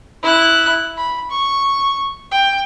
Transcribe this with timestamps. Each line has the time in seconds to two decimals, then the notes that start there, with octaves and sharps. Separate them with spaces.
0.23 E4 F#6
0.98 B5
1.31 C#6
2.31 G5